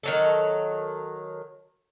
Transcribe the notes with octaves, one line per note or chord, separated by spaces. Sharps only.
D#3 F#3 A4